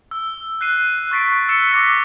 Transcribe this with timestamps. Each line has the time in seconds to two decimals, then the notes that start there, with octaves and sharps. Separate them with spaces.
0.11 E6
0.61 F#6 C7 D#7
1.11 C#6 F#6 A6 B6 C7 D7
1.49 E6 A6 C#7 E7
1.72 D6 E6 A#6 B6